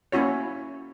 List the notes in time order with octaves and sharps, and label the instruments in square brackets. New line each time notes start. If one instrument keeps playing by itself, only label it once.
[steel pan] A#3 C#4 E4 F#4 C#5